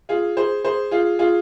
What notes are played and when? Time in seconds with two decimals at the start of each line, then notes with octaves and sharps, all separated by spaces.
0.09 F4 G#4
0.37 G#4 C5
0.65 G#4 C5
0.91 F4 G#4
1.19 F4 G#4